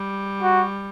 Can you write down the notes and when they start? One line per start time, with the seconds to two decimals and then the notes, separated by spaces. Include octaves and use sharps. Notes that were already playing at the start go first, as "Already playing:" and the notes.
Already playing: G3
0.42 F#4